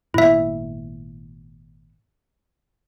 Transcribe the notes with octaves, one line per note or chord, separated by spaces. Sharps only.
G#1 A#2 B3 E4 E5